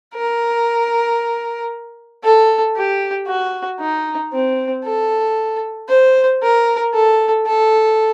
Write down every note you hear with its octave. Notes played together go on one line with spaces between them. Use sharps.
A#4
A4
G4
F#4
D#4
C4
A4
C5
A#4
A4
A4